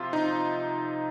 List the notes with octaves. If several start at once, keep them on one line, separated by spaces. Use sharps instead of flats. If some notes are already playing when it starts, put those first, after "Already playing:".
Already playing: C3 F3 F4
D#4